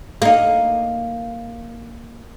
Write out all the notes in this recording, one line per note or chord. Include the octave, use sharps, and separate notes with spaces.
A#3 D#4